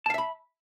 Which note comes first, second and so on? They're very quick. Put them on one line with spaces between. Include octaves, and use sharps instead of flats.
A5 F5 E5 B5